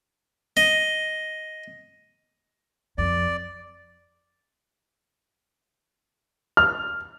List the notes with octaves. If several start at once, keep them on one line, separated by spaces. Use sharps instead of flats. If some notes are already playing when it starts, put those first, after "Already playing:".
D#5
F2 D5
F6